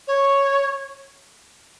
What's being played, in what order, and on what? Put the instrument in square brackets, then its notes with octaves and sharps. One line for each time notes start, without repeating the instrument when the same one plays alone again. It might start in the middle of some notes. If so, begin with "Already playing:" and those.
[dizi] C#5